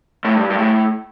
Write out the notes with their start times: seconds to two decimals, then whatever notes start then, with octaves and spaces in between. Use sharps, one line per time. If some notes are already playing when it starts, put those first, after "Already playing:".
0.25 A2
0.36 G2
0.50 G2
0.58 A2